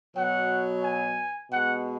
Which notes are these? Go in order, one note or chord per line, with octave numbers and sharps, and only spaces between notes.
B2 F#3 F#5
G#5
B2 G#3 F#5